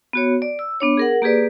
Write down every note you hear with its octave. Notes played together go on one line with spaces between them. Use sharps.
B3 F#4 C#5
D5
E6
B3 D4 C#5
G#4 A#4 F#5
A#3 G4 G#4 B4 D5